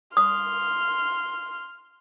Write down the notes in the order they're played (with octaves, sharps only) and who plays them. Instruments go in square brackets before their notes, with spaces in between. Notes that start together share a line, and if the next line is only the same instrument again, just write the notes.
[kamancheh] C6 F6 [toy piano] D#6